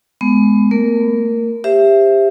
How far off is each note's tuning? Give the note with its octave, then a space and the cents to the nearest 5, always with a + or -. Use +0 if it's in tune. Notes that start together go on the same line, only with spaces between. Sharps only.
G#3 +20 B3 +20
A#3 -45 A#4 +0
G4 +20 C5 +0 E5 +10